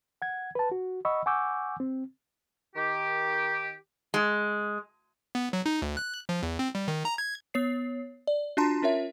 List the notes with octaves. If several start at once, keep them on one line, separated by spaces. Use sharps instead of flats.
F#5 G#6
B4 A5
F#4
D#5 F#5 B5 C#6 E6
F#5 G#5 C#6 D6 E6 G6
C4
D#3 G4
G#3
B3
F#3
D#4
D2
F#6
F3
E2
C4
G3
D#3
A#5
G#6
B3 C#5 C7
D5
D4 F4 F#4 A5 A#5 C6
C#4 F4 A#4 C#5 E5